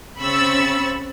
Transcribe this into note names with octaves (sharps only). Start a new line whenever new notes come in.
C#3 C4 B5 C#6 E6 A6